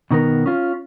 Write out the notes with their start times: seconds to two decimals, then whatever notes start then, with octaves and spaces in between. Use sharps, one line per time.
0.11 B2 D#3 B3 A#4
0.46 C#4 F4